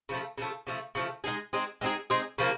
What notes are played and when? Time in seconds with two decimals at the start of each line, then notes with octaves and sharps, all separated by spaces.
0.09 C#3 F3 A3
0.38 C#3 F3 A3
0.67 C#3 F3 A3
0.95 C#3 F3 A3
1.24 G#3 C4 D#4 G#4
1.53 G#3 C4 D#4 G#4
1.81 G#3 C4 D#4 G#4
2.10 G#3 C4 D#4 G#4
2.38 C#3 F3 A#3